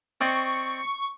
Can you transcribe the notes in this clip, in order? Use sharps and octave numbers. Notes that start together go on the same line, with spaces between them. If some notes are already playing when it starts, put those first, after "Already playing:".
C4 D5 D#5 C#6